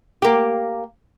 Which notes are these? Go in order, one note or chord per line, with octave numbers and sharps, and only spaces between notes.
A#3 G4